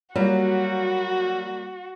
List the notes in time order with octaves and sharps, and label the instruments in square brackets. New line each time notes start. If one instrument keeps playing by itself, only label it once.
[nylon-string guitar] F#3 [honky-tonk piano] G3 A#3 [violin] F#4